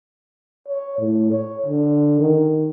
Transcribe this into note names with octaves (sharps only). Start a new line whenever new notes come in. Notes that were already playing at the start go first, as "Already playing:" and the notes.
C#5
A2
C#5
D3
D#3